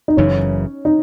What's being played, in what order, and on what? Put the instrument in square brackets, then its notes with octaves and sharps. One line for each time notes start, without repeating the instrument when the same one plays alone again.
[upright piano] D#4
[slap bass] F#1 F#2 C#3 E3 [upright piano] C#4
[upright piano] D#4